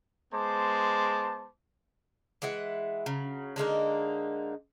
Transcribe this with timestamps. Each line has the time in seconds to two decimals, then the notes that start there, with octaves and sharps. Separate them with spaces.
0.33 G#3 B3 C5 A5 D6
2.42 E3 G#3 E4 F#5
3.06 C#3 F#3
3.56 D3 G#3 A#3 D#4